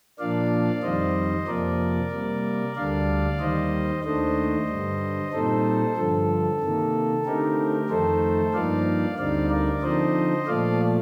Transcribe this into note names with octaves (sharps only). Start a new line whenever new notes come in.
A#2 F3 A#3 D4 D5 F5
F2 D#3 G3 C4 C5 D#5
F2 C3 F3 A#3 A#4 D5
C3 G3 A#3
D2 D3 G3 D4 D5 F5
D#2 D#3 G3 C5 D#5
D#2 D#3 A3 D4 C5 D#5
G2 D3 G3
A#2 G3 C4 D#4 A4 C5
G2 D3 F3 A4
C3 D#3 A#3
D3 A3 C4 D#4 G4 A#4
F2 D#3 A3 D#4 A4 C5
G2 F3 A#3 D#4 D5 F5
D2 D3 G3 C4 D#4 D5 F5
A#4 D5
D3 F3 C4 D#4 C5 D#5
A#2 F3 A3 D5 F5